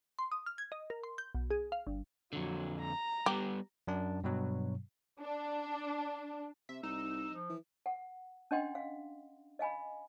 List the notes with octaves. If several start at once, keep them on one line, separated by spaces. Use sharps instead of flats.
C6
D#6
F6
G#6
D#5
A#4
C6
G6
B1
G#4
F5
G1
F2 D3 F#3
A#5
G3 B3 G4
F#2 D4
G2 B2 F#3
D4
C3 E5
C2 D#4 E6
F3
E3
F#5
C#4 D4 D#5 F#5 G5 C6
F5
D#5 F5 G#5 B5